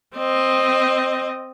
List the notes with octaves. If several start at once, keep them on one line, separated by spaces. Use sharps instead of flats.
C4 D#5